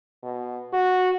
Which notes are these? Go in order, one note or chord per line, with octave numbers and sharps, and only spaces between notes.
B2
F#4